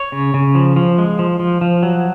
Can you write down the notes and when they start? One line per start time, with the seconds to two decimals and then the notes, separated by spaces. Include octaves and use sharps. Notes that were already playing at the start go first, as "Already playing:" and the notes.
Already playing: C#5
0.12 C#3
0.34 C#3
0.55 F3
0.76 F3
0.98 G#3
1.19 F3
1.40 F3
1.61 F3
1.83 F#3